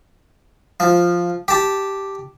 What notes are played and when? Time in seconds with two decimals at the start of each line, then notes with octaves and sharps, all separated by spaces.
0.80 F3
1.48 G4 A5